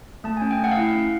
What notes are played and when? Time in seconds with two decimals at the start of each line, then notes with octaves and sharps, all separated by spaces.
0.24 A3 A5
0.37 C#4 G#5
0.51 G5
0.60 A3 F#5
0.71 F5
0.77 E4 F#5
0.95 C#4